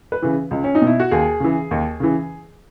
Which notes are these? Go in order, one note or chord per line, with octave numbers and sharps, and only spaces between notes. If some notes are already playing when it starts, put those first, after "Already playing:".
B4
C#3 E3
C#2
C#4
D#4
B2
E4
F#4
D#2 G#4
C#3 E3
D#2
C#3 E3